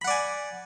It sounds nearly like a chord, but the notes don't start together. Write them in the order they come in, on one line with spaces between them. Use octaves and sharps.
B5 F#5 D5 G#5